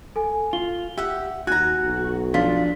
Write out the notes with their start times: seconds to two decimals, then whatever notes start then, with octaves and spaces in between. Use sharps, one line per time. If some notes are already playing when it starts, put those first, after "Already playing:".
0.16 A4 G#5
0.53 F4 G7
0.98 G4 E5 F#5
1.47 D#2 F#4 G#5 A#5 F#6
1.84 B1
2.34 F3 D4 F4 B6